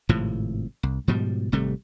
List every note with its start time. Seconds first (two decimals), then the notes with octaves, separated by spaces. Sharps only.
0.09 G#1 A2 C3 F3
0.83 C2
1.08 G#2 B2 F3 G3
1.52 G#1 C3 G3 A3